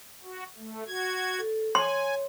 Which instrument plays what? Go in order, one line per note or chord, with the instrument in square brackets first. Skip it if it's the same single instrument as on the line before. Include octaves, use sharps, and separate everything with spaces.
[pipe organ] F#4
A3
F#4 G#6
[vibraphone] A4
[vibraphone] C#5 [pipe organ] G#5 [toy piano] C6